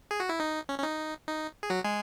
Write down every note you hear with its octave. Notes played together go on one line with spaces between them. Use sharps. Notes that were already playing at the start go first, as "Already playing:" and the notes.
G#4
F#4
E4
D#4
C#4
C#4
D#4
D#4
G#4
F#3 F#4
G#3 G#4